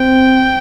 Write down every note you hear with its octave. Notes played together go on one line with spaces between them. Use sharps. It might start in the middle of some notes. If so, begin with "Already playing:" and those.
Already playing: C4 G5